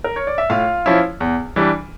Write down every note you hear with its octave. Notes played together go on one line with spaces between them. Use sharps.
A#4
C#5
D5
E5
A2 F4 F5
F3 C#4 E4
E2
E3 G3 D4